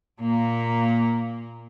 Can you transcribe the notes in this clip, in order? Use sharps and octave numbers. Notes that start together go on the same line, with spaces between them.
A#2 A#3